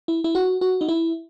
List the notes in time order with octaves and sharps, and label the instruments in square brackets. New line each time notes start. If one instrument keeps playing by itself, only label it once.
[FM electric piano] E4
E4
F#4
F#4
D#4
E4